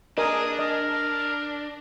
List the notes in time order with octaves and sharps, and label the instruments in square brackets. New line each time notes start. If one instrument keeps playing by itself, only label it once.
[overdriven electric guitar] D4 [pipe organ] G#4 D#6 [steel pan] A#4 D#5
[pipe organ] A#4 [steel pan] D#5